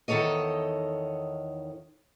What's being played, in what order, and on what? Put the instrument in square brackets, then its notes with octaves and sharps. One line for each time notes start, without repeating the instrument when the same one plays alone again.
[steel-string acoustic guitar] E2 D#3 D#4 A4 C#5 D#5